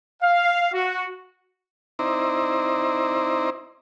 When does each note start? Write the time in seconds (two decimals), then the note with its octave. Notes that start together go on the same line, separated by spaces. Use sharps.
0.22 F5
0.72 F#4
1.99 C4 D#4 E4 C5 D5 A#5